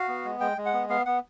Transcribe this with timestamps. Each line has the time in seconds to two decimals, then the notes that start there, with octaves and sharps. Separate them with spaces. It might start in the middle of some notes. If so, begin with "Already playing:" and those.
Already playing: F#4 F5
0.08 B3
0.25 G#3
0.40 G#3 G5
0.58 G#3
0.66 F#5
0.74 B3
0.90 B3 F5
1.06 B3 F#5